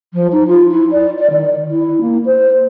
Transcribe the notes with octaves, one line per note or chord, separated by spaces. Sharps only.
F3
D#4
F4
E4
D5
D5
D#3
E4
A#3
C5